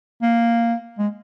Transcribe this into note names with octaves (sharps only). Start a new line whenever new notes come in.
A#3
G#3